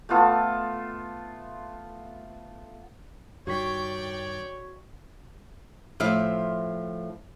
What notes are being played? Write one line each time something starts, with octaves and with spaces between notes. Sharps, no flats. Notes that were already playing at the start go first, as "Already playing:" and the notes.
A3 B3 F4 A4
G2 D#3 F#4 C#5 D5 G5 C#6 B6
A2 F3 C4 E4 E5 F5